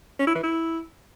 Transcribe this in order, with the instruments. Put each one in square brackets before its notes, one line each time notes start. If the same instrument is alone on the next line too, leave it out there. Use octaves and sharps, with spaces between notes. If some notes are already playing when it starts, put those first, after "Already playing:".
[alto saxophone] C#4
E4
E3
E4